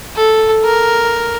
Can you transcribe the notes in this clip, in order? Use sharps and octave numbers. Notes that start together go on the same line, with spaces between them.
A4
A#4